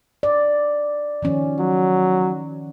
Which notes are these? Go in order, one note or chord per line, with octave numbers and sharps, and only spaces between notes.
D5
D#3 F3 C#4
F#3